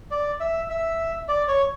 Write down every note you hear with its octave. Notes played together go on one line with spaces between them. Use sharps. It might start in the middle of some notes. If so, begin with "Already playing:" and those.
D5
E5
E5
D5
C#5